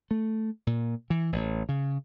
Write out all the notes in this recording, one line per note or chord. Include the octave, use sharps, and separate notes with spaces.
A3
A#2
E3
A1
C#3